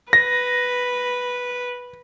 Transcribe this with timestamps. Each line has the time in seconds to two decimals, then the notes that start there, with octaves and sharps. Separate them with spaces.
0.13 B4 A#6